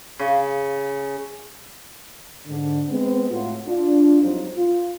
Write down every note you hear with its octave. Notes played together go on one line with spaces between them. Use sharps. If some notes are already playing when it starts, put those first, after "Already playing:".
C#3
G#2 D3
G#3 B3 C4
A2 F4 F#4
D4 F4
F2 F#3 G3 D#4 F4 C5
F4